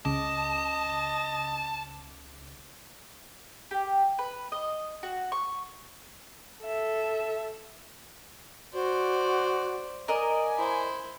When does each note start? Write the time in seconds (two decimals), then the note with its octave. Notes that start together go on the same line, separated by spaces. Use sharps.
0.05 C#2 C#3 D#5 A5 D6
3.71 G4
4.19 B4
4.52 D#5
5.03 F#4
5.32 C#6
6.62 A4 E5
8.74 F#4 C5 D5
10.08 A#4 D5 D#5 G#5
10.56 E4 C5